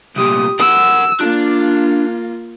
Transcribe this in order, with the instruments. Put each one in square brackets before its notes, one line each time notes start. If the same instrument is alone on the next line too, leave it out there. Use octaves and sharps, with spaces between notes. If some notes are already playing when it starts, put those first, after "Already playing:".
[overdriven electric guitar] C2 A#2 [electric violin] G4 D#6
[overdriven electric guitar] A#4 F#5 [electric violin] E6
[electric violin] A#3 F4 [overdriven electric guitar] D4